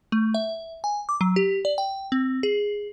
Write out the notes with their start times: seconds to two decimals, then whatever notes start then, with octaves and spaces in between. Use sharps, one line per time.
0.12 A3
0.34 E5
0.84 G#5
1.09 D6
1.21 F#3
1.36 G4
1.65 D5
1.78 G5
2.12 C4
2.43 G#4